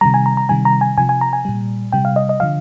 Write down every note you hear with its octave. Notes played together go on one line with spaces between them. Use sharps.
C3 D#3 G3 A#5
G#5
A#5
A#5
C3 D#3 G3 G#5
A#5
G#5
C3 F3 G#5
G#5
A#5
G#5
A#2 G3
C3 G3 G5
F5
D#5
D#5
D3 F3 F5